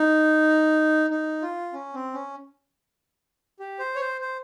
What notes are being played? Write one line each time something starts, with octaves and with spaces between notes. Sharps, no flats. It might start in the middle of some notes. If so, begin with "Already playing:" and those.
Already playing: D#4
D#4
F4
C#4
C4
C#4
G4
C5
C#5
C5
C5